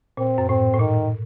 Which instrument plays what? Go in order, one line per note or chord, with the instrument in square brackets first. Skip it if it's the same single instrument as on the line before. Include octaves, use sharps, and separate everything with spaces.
[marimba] A#2 [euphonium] C4
[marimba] F#2
[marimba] A2 [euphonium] C4
[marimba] A2
[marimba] A#2 [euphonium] D#3